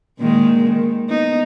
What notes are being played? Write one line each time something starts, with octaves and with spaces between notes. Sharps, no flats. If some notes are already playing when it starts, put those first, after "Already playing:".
A#2 D#3 G#3
D#3
B3 D#4